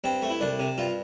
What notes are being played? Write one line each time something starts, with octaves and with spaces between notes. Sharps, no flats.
G2 C4
A3
E4
C2 D4
C3
G2 F4